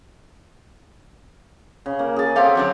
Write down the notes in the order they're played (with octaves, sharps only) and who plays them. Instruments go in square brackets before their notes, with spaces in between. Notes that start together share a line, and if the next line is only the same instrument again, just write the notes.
[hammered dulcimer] C#3
A#3
G#4 A5
[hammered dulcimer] C4 G4 [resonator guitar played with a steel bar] A4 F5 F#5
[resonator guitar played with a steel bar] D3 F#3 D4